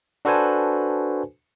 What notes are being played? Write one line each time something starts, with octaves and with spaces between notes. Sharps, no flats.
D4 F#4 A4 B4 C5 G#5